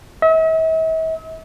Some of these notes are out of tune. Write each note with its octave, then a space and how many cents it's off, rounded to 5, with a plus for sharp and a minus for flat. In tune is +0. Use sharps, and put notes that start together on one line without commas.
E5 -45